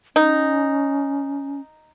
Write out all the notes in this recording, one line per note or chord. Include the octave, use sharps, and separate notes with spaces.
C#4 D#4